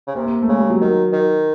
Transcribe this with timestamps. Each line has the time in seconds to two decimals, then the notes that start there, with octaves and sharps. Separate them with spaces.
0.07 C#3
0.15 C3 A#3
0.26 A#3
0.42 A3
0.48 C#3 G#3
0.58 G3
0.70 F#3
0.81 D#3
1.13 D#3